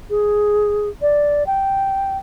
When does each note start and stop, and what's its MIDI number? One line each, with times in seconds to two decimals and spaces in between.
0.10 0.89 68
1.02 1.46 74
1.46 2.17 79